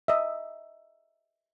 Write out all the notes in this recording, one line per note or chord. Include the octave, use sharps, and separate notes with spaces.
D#5 E5